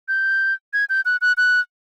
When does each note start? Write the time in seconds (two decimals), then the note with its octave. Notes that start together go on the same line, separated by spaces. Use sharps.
0.08 G6
0.73 G#6
0.90 G6
1.05 F#6
1.21 F#6
1.37 F#6